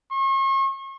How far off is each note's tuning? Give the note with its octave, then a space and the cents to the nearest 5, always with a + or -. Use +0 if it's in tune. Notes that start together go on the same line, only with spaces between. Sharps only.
C#6 -40